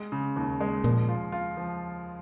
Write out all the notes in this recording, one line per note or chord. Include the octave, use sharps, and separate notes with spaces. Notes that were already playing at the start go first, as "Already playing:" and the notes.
Already playing: G#3
C#3
D#2
G#3
A#2 F3
F4
F4
F3